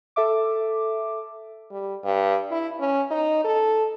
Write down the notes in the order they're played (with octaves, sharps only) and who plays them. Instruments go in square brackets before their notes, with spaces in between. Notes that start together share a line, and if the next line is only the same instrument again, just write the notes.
[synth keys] A4 E5 D6
[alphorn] G3
G2
E4
C#4
D#4
A4